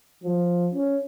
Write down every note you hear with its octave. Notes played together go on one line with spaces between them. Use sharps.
F3
C#4